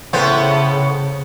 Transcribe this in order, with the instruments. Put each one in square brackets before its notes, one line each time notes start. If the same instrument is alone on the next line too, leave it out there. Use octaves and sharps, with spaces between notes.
[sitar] A2 B3 C5 [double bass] C#3